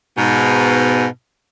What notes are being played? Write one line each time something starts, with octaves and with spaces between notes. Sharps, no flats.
G#2 B2